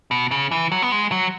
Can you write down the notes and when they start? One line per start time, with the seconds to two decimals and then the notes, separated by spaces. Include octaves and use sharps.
0.11 B2
0.31 C#3
0.51 E3
0.72 F#3
0.82 B3
0.92 G#3
1.12 F#3